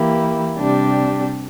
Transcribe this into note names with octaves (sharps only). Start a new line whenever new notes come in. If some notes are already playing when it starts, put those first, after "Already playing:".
Already playing: E3 A#3 E4 G4
C3 G3 D4 G4